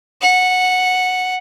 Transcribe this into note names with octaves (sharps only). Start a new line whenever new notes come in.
F#5